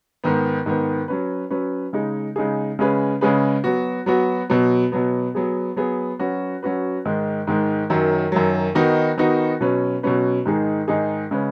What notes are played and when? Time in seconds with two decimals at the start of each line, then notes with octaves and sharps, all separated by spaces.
0.24 G#2 D#3 B3
0.66 G#2 D#3 B3
1.08 F#3 C#4 B4
1.50 F#3 C#4 B4
1.93 C#3 G#3 D#4 G#4
2.36 C#3 G#3 D#4 G#4
2.79 C#3 G#3 C#4 G#4 B4
3.21 C#3 G#3 C#4 G#4 B4
3.64 F#3 B3 F#4
4.06 F#3 B3 F#4
4.50 B2 F#3 B3
4.92 B2 F#3 B3
5.35 F#3 B3 G#4
5.76 F#3 B3 G#4
6.19 F#3 C#4 F#4 B4
6.63 F#3 C#4 F#4 B4
7.05 G#2 D#3 G#3
7.47 G#2 D#3 G#3
7.90 F#2 D#3 F#3
8.32 F#2 D#3 F#3
8.75 D#3 B3 D#4 F#4
9.18 D#3 B3 D#4 F#4
9.61 B2 F#3 C#4 B4
10.03 B2 F#3 C#4 B4
10.45 G#2 D#3 G#3 D#4 G#4
10.88 G#2 D#3 G#3 D#4 G#4
11.31 C#3 G#3 C#4 B4